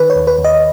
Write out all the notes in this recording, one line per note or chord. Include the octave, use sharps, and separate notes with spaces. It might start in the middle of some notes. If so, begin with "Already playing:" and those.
Already playing: D#3 B4
C#5
D#2
B4
D#2
D#5